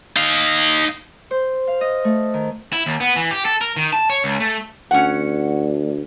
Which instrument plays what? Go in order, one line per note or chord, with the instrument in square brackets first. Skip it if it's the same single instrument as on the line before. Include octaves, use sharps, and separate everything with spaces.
[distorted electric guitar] D#4 F5
[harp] C5
F5
D#5
A3
D#3
[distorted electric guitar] E4
D#2
B3
E3
G4
A4
A#4
D#3
A5
C#5
C#2
A3
[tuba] D2 [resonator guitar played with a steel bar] C#4 F#5